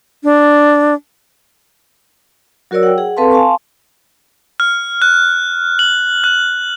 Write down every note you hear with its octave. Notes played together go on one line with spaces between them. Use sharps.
D4
F#3 F#4 A#4 C#5 D5 E6
F#5 G5
G#4 F#5
C4 A4 B4 F5 A5 C6
F5 G#5 A5 C6 C#6
F6
F#6
F#7
F#6